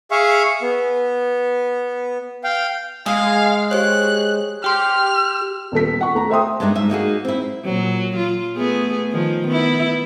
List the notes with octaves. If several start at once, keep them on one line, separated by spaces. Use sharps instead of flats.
G#4 E5 F5 C#6
B3
F5 G5
G#3 G#4 F5
G4 C5 C#5 F#6
G4 G5 C6 F6
D#1 B3 A4 B6
F#5 C#6
A3 A#5
A4 C5 E5 G5 C6 D#6
G2 G#3 B3 D4 D#4
G#2 E5 G#5
A#3 D#4 F#4 G#4
C4 E4
A#2 F#3
F4
A3 B3 G#4
D#3 F3
B3 E4